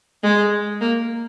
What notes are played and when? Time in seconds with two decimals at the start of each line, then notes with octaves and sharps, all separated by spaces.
0.23 G#3
0.81 A#3